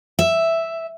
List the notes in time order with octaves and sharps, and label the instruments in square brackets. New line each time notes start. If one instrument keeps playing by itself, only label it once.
[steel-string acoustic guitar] E5